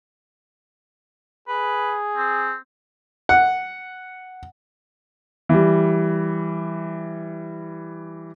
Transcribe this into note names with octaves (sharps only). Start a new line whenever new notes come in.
G#4 B4
C4
F#5
E3 G3